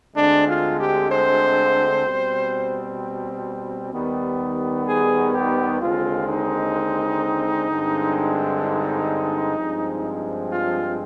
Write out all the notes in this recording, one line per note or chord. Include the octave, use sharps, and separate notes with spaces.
D2 D3 G#3 C4 D4
F4
G4
C5
B2 G3 C4
D#2 D#3 G3 B3
G#4
G4
D#2 D3 G#3 C4 F4
D#4
G2 D3 G#3 C4
D#4
G2 F3 G#3 C4
F4